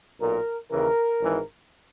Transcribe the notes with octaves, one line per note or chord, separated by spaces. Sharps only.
B1 A#2 A#4
D#2 C#3 E3 A#4
G#1 G#2 E3